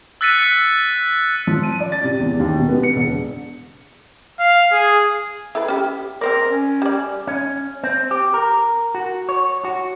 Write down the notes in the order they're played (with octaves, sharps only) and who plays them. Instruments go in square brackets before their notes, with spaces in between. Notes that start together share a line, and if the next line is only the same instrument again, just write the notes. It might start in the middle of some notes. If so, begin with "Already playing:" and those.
[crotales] E6 F#6 A6 B6 C#7 D#7
[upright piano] F3
D#7
D5
A6
C3
E2
D#2
B2
B3
C#7
E1
[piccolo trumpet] F5
G#4
[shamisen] E4 A4 B4
C#4 G4
[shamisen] C4 C5 D5 [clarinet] A#4
[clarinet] C#4
[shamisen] G3 D5
[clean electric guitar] C#4
C4
G4
A#4
F#4
C#5
F#4